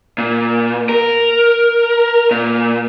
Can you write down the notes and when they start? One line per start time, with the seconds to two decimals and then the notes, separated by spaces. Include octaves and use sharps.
0.18 A#2
0.89 A#4
2.31 A#2